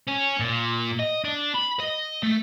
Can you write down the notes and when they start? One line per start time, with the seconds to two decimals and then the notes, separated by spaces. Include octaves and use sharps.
0.08 C#4
0.40 A#2
0.99 D#5
1.25 D4
1.55 B5
1.80 D#5
2.23 A3